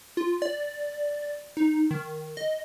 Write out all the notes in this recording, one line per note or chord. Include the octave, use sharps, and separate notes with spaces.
F4
D5
D#4
D#3
D#5